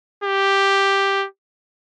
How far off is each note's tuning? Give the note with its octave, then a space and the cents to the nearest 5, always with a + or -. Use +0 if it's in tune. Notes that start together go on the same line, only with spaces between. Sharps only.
G4 +5